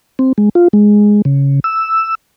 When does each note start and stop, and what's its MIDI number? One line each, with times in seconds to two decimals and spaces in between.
0.19 0.33 60
0.38 0.49 56
0.55 0.68 65
0.73 1.22 56
1.25 1.60 49
1.64 2.15 88